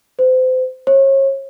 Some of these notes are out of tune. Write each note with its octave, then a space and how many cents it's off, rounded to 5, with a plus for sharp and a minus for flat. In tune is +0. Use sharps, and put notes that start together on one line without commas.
C5 -30
C#5 -35